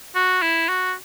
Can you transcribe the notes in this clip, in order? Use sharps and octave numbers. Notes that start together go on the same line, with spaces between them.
F#4
E4
F#4